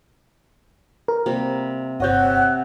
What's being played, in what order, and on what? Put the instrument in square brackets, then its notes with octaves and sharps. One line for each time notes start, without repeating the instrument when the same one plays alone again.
[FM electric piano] A#4
[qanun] C3 G3 A#3
[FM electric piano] G1 C#5 G6 [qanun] C3 D#5 [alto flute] F#5